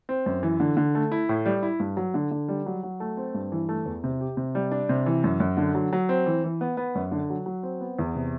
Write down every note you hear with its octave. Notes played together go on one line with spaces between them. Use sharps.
C4
F#2
E3
D3
D3
A3
E4
A2
G3
E4
G2
F#3
D3
D3
G3
F#3
F#3
A3
C4
G2
E3
A3
E2
C3
G4
C3
G3
D4
C3
E3
F#2
F#2
D3
F#3
F#3
C4
E3
E3
B3
B3
F#2
D3
F#3
F#3
C4
B3
E2
C3